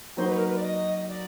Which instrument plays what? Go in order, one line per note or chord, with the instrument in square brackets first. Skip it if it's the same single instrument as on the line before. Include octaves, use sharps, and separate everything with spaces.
[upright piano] F#3 A#3 D#4 F#4 [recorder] C5
[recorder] B4
A#4
B4
D5
D#5
D5